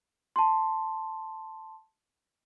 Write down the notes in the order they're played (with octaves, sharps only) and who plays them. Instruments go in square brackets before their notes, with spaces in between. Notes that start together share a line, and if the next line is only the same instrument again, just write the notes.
[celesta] A5 C6